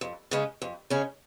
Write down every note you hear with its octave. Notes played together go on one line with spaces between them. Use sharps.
F2
C#3 G#3 C#4
F2
C#3 G#3 C#4